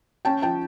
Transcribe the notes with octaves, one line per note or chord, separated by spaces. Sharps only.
C#4 G5 A5
F3 G5 A5